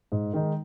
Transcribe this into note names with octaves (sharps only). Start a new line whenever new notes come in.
G#2
D#3 G#3 D#4